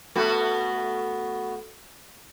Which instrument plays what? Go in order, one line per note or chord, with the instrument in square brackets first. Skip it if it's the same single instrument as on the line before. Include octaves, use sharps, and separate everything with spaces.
[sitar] A3 B3 F#4